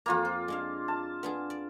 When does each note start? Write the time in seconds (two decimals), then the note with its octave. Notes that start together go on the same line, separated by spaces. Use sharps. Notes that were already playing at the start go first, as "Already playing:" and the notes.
0.06 F2 A#3 F4 G#5 A#5
0.25 C5
0.48 G#3 D4 F5
0.88 A5
1.23 B3 D4 G#4
1.50 D5